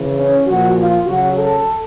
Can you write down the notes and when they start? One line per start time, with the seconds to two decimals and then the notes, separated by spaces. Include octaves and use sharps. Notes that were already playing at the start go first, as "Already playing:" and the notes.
Already playing: C#3 E3
0.17 C#4
0.47 A#2 F3 F#4
0.77 F4
1.06 C#3 F#3 F#4
1.36 A4